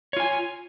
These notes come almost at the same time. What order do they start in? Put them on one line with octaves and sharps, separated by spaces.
C#5 F4 G#5